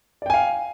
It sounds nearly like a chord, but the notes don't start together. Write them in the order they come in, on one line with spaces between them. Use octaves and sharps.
D5 G5 G#5 F5